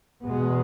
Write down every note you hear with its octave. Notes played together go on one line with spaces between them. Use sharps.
E2 B2 G#3 B3